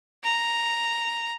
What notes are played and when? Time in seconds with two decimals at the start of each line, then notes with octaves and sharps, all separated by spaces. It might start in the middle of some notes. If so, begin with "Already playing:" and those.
0.24 A#5